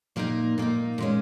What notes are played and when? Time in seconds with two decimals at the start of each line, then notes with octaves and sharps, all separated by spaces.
0.16 A#2 A#3 D#4 A#4 D#5
0.58 A#2 A#3 D#4
0.98 A#2 G#3 C#4